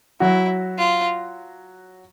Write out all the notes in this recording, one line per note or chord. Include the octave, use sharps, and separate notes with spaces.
F#3 E4 F#4
F4